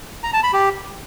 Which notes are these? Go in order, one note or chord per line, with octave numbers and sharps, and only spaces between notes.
A#5
A5
B5
G4